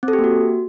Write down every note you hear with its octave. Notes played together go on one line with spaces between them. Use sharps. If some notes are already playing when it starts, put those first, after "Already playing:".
C4
A4
G4
A#3
F#4